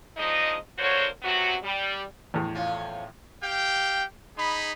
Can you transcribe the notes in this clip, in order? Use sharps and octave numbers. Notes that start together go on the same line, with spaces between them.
F3 G#3 D4 D#4 D#5
D3 A#3 F#4 C5 C#5
C3 F#3 B3 F#4
G3
E2 A2
F2 C#4 F4
G4 F5 G5
D#4 G#4 B5